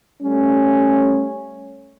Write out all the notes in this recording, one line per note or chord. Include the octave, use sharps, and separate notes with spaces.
G3 A3 C#4